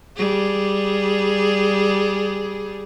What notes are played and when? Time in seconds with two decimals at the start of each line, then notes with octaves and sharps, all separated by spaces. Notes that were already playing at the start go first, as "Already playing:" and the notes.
0.17 G3 G#4